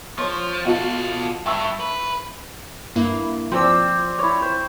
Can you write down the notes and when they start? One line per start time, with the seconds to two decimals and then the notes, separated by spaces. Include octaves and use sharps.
0.18 F3 C#5 C6 C#6
0.65 B2 F4 F#4 A4
1.46 G2 E5 C#6 E6
1.80 B4
2.95 G2 A#3 E4
3.52 F3 C4 C5 D5 E6
4.19 E4 C#5
4.42 C5